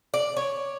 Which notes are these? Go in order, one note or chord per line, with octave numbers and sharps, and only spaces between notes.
D5
C#5